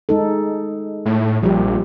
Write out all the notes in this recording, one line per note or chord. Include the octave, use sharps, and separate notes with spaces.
G#3 D#4 A4
A2
A#1 F3 G3 G4